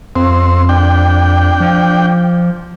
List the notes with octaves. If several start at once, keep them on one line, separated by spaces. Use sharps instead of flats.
F2 C4
D4 G5
F3